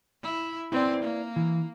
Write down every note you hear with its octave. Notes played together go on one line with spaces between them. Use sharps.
E4
C4 E4 B4 D5
A#3
E3